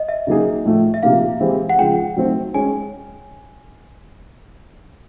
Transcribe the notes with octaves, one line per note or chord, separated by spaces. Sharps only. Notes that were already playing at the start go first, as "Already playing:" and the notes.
Already playing: D#5
E5
C#3 F#3 A#3 D#4 G#4
A2 F3 A3
E5
C3 F3 A#3 F5
E3 G#3 C4 E4 G4
F#5
C#3 F3 G#3 G5
F#3 A3 C4 D#4
G#3 C#4 G#5